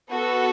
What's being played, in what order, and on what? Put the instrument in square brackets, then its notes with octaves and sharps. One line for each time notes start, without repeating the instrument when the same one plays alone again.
[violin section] B3 F#4 A4